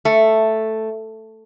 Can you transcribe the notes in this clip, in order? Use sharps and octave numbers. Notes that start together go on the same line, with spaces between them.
A3